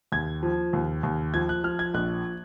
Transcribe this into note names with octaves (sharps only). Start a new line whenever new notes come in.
D#2 G#6
F3
D#2
D#2
F3 G#6
F#6
F3 F6
G#6
A#1 F#6